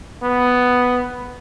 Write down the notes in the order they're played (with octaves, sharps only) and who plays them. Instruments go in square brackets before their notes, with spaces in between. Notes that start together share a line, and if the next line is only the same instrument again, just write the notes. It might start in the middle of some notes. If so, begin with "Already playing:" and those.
[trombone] B3